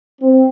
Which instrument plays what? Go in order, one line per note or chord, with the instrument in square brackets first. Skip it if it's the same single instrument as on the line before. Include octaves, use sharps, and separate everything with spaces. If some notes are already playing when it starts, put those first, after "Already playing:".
[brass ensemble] C4